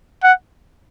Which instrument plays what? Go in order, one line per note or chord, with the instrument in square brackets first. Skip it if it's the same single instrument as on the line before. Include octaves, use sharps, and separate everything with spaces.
[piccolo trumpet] F#5